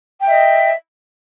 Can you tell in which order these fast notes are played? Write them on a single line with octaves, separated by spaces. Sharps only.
G5 E5 D#5